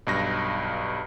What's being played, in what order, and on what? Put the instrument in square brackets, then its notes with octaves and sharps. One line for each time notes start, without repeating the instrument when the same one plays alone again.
[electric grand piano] B1 G2 A#6